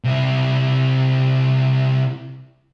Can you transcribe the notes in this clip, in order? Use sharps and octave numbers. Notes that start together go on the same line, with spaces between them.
C3 E4